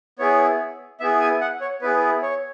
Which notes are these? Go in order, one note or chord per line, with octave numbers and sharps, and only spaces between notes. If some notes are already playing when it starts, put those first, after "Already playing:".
B3 E4 G#4 C#5
B3 E4 G#4 E5
G#5
F#5
C#5
B3 E4 G#4 B4
C#5